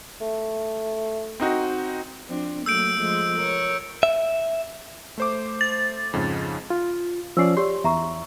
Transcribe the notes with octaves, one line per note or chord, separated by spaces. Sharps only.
A3
C4 D#4 F#4
F3 C4 D4
F#3 A3 A#3 E6 G6 D7
F3 G#3 A3
A#4 C#5
E5
A3 C5 D6
A6
F2 G#2 C#3
F4
F3 C#4 D5 E6 C7
G4 C#5 D5 C6
E2 E5 A#5 C#6